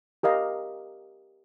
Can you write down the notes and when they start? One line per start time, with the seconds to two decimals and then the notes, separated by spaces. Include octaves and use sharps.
0.23 G4 A#4 D#5 F5